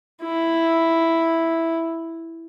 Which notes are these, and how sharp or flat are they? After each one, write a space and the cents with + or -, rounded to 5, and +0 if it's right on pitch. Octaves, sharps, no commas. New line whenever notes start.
E4 +0